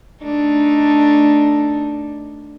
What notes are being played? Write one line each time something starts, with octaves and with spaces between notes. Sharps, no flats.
A3 D4 D#4